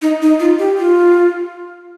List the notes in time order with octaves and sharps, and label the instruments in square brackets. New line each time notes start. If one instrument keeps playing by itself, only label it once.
[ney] D#4
D#4
F4
G4
F4